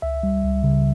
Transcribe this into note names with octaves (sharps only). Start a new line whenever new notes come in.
C#2 E5
G3
C#2
C#3